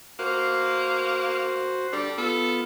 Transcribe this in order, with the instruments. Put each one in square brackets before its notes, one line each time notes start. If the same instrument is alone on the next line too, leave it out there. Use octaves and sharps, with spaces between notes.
[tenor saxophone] A#3 [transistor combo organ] F#4 C5
[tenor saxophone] G3 [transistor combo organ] D4 A4
[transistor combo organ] B3 F4 [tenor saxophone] A4